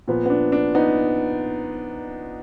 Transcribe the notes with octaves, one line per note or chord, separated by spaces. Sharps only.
A#2 F3 B3
B3
D4
D4
B3 D#4